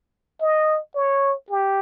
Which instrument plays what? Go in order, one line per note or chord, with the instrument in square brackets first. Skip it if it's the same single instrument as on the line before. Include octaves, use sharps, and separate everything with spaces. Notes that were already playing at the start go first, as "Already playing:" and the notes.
[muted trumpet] D#5
C#5
G4